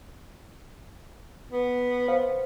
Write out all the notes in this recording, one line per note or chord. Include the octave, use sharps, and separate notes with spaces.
B3
C5 F5